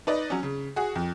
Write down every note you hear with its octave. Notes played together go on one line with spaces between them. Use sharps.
D#4 B4 D5 D#5
F#3 C#4
C#3
F#4 G#4
F2